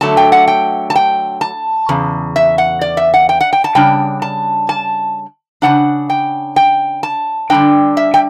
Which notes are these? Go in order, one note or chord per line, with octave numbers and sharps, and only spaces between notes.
D3 F#3 A3 A5
G5
F#5
G5
A5
G5
A5
E2 C#3
E5
F#5
D5
E5
F#5
G5
F#5
G5
A5
C#3 G3 D4 G5
A5
A5
C#3 G3 D4 F#5
G5
G5
A5
D3 G3 D4 G5
E5
G5